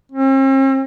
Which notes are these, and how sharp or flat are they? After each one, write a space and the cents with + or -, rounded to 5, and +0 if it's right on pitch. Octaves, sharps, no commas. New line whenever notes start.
C4 +45